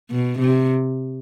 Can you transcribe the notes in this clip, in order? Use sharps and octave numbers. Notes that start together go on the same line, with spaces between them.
B2
C3